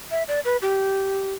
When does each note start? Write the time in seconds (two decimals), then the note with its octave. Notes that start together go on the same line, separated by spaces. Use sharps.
0.11 E5
0.28 D5
0.45 B4
0.62 G4